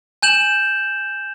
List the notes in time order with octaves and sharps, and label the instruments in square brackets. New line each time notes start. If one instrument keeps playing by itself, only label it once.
[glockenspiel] G#5 G6 E7 F#7